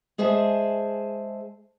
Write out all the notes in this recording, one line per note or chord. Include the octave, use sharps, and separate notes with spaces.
G#3 G#4 C5 E5 A5